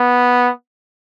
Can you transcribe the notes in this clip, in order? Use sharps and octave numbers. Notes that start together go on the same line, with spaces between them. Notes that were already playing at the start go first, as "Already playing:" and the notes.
Already playing: B3